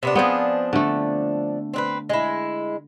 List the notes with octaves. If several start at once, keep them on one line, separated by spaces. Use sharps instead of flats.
C3 B3 D4
F3 B3 C4 D4 G#4
D3 A3
C4 D4 B4
G#3 E4